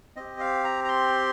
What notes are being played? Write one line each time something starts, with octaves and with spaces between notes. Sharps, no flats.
C4 G4 D#5
F5
A#5
A#5
C6